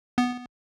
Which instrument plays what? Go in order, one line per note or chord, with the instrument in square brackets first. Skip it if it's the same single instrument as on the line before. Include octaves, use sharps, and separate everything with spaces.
[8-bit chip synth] B3